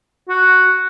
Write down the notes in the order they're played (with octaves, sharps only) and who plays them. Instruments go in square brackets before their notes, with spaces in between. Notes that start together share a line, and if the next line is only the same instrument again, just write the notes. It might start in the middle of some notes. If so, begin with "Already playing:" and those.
[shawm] F#4